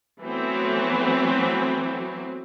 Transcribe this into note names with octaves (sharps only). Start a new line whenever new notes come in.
E3 F#3 A3 B3 C4